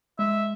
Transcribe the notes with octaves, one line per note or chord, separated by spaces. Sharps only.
G#3 E5